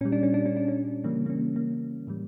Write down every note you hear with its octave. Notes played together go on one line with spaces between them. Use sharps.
A#2 G3 C#4
D4
C#4
D4
C#4
D4
C#4
C#3 E3 G3 A#3
A#3
C#4
A#3
A2 E3 G3